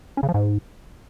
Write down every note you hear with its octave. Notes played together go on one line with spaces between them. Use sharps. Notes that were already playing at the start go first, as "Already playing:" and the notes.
C#4
C#3
F3
G#2